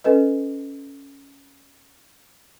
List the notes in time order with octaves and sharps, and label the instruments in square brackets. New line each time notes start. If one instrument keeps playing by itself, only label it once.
[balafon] C#4 A4 B4 D#5